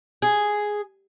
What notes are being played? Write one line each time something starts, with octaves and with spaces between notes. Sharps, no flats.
G#4